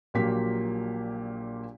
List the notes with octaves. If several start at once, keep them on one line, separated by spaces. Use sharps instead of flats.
A#1 A#2 F#3 A#3 G4 B6